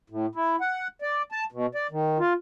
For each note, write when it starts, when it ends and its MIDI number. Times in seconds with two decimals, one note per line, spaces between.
0.10 0.26 45
0.35 0.56 64
0.61 0.88 78
1.02 1.22 74
1.32 1.44 81
1.52 1.66 47
1.75 1.87 74
1.91 2.18 51
2.19 2.33 65